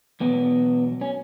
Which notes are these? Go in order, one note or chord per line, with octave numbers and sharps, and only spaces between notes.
E2 B2 F#3 B3
C#4